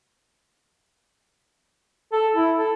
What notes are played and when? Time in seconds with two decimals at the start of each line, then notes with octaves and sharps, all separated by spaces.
2.12 A4
2.35 E4
2.58 A4